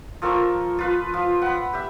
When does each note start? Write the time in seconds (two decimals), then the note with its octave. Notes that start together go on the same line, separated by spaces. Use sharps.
0.22 F3 A4 A#4 C#6
0.79 F4 B4
1.14 F3
1.42 F#5 B5
1.73 G4 E5